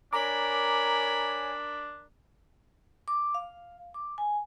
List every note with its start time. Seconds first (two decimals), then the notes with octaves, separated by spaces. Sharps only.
0.13 D4 A#4 C#5 G#5 A#5 B5 D6
3.08 D6
3.34 F5
3.94 D6
4.18 G#5